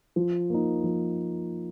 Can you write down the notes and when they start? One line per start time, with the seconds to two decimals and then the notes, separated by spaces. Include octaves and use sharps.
0.16 F3
0.50 A#3 D#4
0.84 F3